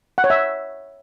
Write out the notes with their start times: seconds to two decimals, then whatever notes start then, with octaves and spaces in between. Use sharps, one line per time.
0.18 F#5
0.24 C#5
0.30 E5